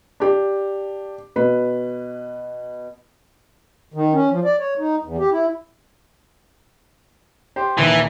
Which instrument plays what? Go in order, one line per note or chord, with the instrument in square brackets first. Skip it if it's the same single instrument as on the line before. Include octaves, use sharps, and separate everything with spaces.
[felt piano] D4 G4
B2 B4
[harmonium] D#3
C#4
F3
D5
C#5
D#4
E2
G4
E4
[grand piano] G4 C5 G5
[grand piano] D#1 D#2 A#3 [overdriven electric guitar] E3